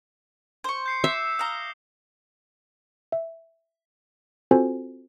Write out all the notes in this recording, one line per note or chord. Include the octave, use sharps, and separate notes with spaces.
C5 C#6
G6 C7 C#7
E5 D6 C7 E7
F5 A#5 D#6 G7
E5
C4 F4 F#4 A4 C5 G#5